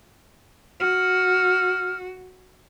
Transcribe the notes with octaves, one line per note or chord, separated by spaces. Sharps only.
F#4 F6